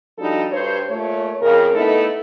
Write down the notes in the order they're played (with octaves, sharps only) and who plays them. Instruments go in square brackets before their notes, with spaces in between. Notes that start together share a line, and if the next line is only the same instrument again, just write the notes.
[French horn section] F3 G3 D4 D#4 F#4 A4
G2 C5 C#5
A#2 A3 F4 C#5
F2 C#3 A#4
A3 B3 D#4 E4 A4